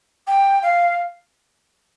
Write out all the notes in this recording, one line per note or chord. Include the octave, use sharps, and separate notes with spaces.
G5
F5